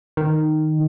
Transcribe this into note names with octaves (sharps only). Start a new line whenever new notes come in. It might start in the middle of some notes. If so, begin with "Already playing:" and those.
D#3